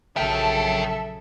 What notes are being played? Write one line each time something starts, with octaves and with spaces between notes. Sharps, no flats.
A#1 C#3 F#3 A4 A#4 E5 G5